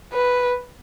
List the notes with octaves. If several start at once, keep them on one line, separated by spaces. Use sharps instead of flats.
B4